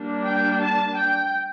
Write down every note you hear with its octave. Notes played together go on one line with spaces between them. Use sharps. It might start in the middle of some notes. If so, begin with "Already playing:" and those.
Already playing: G3 A#3 D4
G5
A5
G5